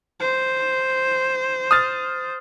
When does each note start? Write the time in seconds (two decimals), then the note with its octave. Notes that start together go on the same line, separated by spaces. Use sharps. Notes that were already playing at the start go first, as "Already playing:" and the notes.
0.20 C5
1.71 D#6 F6 A6